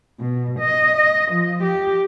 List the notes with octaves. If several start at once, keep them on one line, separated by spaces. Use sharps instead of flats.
B2
D#5
D#5
F3
G4